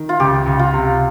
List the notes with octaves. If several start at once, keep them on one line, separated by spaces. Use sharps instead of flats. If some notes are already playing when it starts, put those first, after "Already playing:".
Already playing: D#3
F4
C#2 G4
C#2
F4
C3